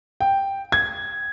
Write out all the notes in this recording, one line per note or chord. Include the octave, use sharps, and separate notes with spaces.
G5
G#6